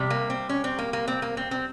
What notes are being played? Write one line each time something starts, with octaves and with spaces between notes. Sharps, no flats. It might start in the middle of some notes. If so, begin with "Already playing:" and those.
Already playing: C3 G3
A#3
C4
C#4
C4
A#3
A#3
C4
A#3
C4
C4